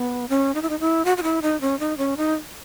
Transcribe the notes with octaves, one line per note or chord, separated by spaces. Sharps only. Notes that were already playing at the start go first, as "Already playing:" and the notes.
Already playing: B3
C#4
D#4
E4
D#4
E4
F#4
F#4
E4
D#4
C#4
D#4
C#4
D#4